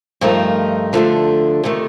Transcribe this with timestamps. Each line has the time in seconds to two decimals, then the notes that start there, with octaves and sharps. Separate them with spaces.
0.21 G2 F3 A3 D#4 A#4
0.93 D3 F3 A3 D4
1.63 C3 D#3 A3